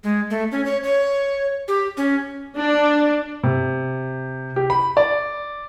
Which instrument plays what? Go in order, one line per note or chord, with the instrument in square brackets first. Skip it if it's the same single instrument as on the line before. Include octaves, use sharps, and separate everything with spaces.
[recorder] G#3
A3
C#4
C#5
C#5
G4
C#4
[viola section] D4
[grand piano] C3
G4
B5
D5